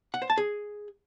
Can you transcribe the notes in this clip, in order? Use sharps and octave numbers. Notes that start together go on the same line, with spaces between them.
F#5
C5
A5
G#4